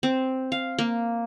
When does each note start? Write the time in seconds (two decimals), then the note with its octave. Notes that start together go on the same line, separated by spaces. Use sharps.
0.03 C4
0.52 F5
0.79 A#3